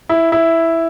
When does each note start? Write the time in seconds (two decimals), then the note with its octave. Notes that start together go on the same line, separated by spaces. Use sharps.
0.09 E4
0.32 E4